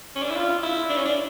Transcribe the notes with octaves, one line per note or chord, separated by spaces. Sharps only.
C#4
D4
E4
F4
E4
D4
C#4
D4